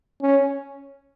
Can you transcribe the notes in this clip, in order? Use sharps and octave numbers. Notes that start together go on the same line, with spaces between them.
C#4